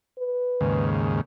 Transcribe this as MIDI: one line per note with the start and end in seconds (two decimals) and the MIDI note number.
0.19 0.87 71
0.61 1.21 39
0.61 1.21 44
0.61 1.21 49